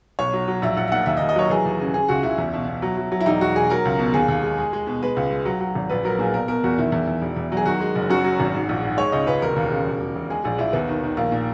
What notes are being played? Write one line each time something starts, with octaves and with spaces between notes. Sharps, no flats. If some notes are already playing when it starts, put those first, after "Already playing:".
B1 C#5
F#3
F#3
A#1 E5
A#1 F#5
E5
A#2 F#5
D#2 E5
D#5
D#2
D#5
F#3 C#5
E3 G#4
D#2
C#3
C#3 G#4
C#2 F#4
C#2 E4
E2
B2
B2
F#3
F#3
F#3
E4
E1 D#4
E1 F#4
E1 G#4
F#3 A#4
C#2
B2
D#2 G#4
D#2
G#3
G#3
G#3
B2
G#3 B4
C#2
G#3
F#3
F#3
G#1
A#1 B4
F#3 A#4
A#2 G#4
B2 A#4
B2 A#4
E2 F#4
D#3 E4
E2
E2
E1
E2
F#3
G#4
D#3 F#4
G#3
F#1
F#2 F#4
F#3
G#1
G#2
A#1
G#2
G#3 C#5
C#2 D#5
C#2 B4
E1 A#4
D#2
C#3
E1
E1
E1
G#3 G#4
A#1 G#4
A#1 E4
D#2 B3
D#3
D#3
A#1 A#3
A#2